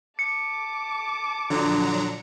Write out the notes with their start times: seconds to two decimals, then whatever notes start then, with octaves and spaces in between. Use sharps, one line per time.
0.19 A5 D6 C#7
1.50 A#1 D3 F#3 D4 A#5